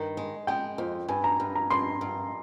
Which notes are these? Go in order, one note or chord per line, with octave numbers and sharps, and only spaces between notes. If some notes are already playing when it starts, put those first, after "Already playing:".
Already playing: G2 D#3
G#3
G#3 G5
F2
G2 G#5
A#5
G2
A#5
G2 C6
G2